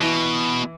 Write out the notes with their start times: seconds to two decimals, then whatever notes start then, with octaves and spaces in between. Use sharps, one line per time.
0.01 B2 E3